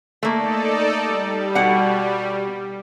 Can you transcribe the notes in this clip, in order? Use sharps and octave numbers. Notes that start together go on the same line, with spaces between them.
A3 A#3 D#4 A4 D5
G3
B2 F#5